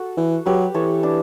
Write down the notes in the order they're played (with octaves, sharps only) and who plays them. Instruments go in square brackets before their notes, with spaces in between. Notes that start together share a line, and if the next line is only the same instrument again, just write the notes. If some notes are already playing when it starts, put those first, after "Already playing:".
Already playing: [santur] F#4 A4
[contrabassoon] E3
[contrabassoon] F#3 [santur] G4 B4
[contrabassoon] E3 [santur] A4 C#5
[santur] D4